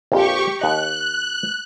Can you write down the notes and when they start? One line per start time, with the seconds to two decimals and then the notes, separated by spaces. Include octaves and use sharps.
0.12 A#1 F2 F4 G4 C#6
0.59 D#2 D#5 A#5 F#6